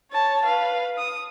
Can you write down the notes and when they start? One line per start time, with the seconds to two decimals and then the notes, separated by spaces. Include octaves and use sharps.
0.11 C#5 A5
0.45 B4 F5
0.98 D#6